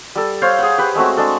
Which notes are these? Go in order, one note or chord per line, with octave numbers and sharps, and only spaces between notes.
G3 A4
C5 C#5 F5
G#4 F5 F#5
G4 B4 C#5
G#3 A3 C4 F#4
G#3 D4 A4